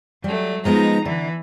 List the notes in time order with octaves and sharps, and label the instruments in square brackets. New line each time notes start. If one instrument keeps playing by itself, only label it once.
[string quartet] F#3 A3 [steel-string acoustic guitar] G3
[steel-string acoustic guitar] F3 G#3 B3 [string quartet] D#4 A#5
[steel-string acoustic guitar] D3 [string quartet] E3